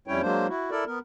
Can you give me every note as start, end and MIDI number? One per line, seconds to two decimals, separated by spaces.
0.08 0.21 41
0.08 0.21 55
0.08 0.21 61
0.08 0.21 64
0.08 0.21 73
0.08 0.21 79
0.21 0.47 54
0.21 0.47 56
0.21 0.47 58
0.21 0.47 62
0.21 0.47 72
0.48 0.71 64
0.48 0.71 66
0.71 0.84 64
0.71 0.84 69
0.71 0.84 70
0.71 0.84 74
0.87 0.99 59
0.87 0.99 70